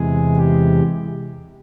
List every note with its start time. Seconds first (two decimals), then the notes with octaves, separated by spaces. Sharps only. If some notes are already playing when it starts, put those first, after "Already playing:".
Already playing: E2 C3 E3 G#3 G#4
0.36 G4